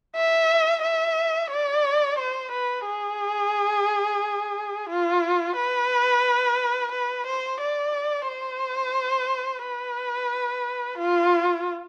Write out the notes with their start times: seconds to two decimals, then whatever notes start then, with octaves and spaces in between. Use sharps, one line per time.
0.15 E5
0.82 E5
1.51 D5
2.18 C5
2.51 B4
2.86 G#4
4.89 F4
5.56 B4
6.92 B4
7.26 C5
7.60 D5
8.28 C5
9.64 B4
10.98 F4